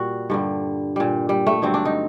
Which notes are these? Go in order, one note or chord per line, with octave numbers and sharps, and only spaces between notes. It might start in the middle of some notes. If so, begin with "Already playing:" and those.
Already playing: A#2 G3 F#4
G2 D3 G3
A#2 G3
G3
A3
G2 D3 F#3 C4
D4
D#4